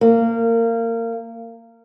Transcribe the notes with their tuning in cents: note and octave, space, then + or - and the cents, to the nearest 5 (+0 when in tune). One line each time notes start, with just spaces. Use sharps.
A#3 -25